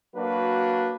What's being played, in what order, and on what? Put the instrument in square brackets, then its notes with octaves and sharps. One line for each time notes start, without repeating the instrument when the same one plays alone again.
[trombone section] F#3 A#3 D4 F#4 B4